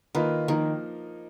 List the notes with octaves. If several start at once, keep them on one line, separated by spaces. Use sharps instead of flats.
D#3 A#3 F4 B4 D#5
D#3 F3 A#3 D#4 A#4